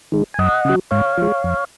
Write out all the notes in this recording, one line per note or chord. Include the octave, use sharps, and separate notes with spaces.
D#3 G#3
G#5
F#2 D#5 F#5
C#3 F#3
G#2 C#5 F5
F3 G#3
F2